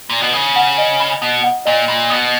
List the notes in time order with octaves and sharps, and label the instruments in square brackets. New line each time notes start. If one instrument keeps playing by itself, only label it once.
[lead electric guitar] A#2
B2
[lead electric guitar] C#3 [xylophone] D#6
[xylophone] F#5
D#5
B5
[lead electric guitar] B2 [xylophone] D#6
[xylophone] F#5
[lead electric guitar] A#2 [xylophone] D#5
[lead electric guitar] A#2 [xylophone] B5
[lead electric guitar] B2 [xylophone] D#6